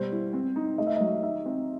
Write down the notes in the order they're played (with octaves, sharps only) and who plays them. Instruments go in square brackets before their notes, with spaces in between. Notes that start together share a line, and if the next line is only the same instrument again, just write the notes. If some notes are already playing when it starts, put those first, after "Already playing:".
Already playing: [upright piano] B2 G3 [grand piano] C5
[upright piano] E4
C4
D#4
[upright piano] A3 [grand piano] D#5
[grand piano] E5
D#5
[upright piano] F#3
[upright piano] D#4 [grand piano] E5
[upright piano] C4